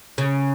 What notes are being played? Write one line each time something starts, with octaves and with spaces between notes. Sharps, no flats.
C#3